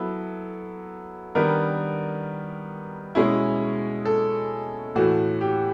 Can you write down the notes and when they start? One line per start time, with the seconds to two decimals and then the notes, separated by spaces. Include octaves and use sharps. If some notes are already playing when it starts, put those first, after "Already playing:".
Already playing: F#3 B3 E4 A4
1.35 D#3 G3 B3 D4 A#4
3.15 B2 G#3 C#4 E4
4.05 A4
4.95 A2 E3 A3 F#4
5.41 G4